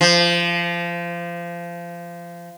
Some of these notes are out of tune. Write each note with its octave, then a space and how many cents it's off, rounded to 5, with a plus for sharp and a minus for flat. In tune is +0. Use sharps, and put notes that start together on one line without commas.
F3 -25